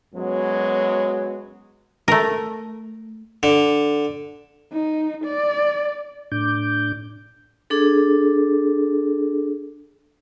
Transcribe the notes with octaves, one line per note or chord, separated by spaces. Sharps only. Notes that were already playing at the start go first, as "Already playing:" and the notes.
F#2 F#3 G#3 B3
A3 A#4
D3
D#4
D5
A2 D4 D6 G6
D4 G#4 A4